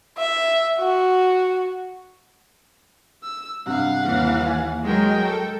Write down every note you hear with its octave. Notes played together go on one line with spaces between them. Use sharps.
E5
F#4
E6
G2 C3 F5 F#5
D#2 E3
G#5
F#3 G#3 A#4 G5
A4